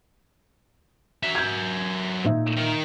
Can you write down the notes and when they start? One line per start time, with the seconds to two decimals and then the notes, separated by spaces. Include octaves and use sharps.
1.23 F#3 E5
1.35 G6 G#6
2.24 A#2 D#4 E5
2.56 D#3 A#4